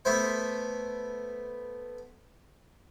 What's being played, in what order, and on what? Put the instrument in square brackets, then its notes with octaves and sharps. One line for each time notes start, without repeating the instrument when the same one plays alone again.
[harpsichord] A3 B3 E4 C5